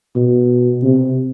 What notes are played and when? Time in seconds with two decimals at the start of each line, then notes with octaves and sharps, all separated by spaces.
0.16 B2
0.83 C3